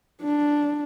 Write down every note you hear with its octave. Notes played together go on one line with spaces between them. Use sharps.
D4